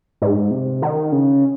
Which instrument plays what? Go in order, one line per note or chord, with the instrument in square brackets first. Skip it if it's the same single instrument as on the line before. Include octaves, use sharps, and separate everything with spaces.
[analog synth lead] G#2
C3
D#3
C#3